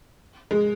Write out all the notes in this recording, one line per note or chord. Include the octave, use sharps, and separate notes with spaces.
G#3